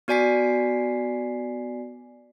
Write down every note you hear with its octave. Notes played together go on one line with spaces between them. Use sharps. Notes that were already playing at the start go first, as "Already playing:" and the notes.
B3 F#4 D5 G#5 B6 C7